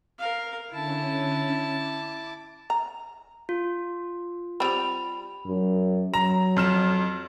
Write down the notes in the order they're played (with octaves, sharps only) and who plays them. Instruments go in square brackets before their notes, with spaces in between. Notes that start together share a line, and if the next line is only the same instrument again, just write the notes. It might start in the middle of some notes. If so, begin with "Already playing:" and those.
[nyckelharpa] A#4 F5
[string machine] D3 C#4 [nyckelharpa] E4 A5
[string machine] D6
[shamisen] A#5
[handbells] F4
[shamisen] G3 C4 [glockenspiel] B5 F7
[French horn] F#2
[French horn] F#3 [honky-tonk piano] A#5
[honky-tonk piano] F2 F6 E7